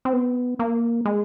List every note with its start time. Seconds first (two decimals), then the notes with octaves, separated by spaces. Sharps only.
0.05 C4
0.13 B3
0.59 A#3
1.05 G#3